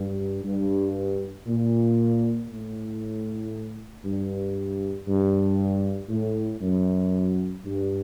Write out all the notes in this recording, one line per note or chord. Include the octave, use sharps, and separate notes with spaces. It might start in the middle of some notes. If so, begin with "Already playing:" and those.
Already playing: G2
G2
A#2
A2
G2
G2
A2
F#2
G2